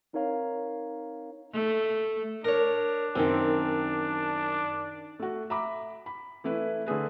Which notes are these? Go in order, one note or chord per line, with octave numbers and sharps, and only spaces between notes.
C4 D#4 A#4 C#5 F5 A#5
A3
D4 A#4 C#5
F#2 D#3 C4
A3 F#4
E5 A#5 B5 D6
B5
E3 A3 E4 B4
D3 A3 G#4 B4